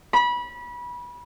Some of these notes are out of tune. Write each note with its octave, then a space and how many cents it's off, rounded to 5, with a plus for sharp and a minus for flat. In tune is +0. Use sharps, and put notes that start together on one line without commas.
B5 -25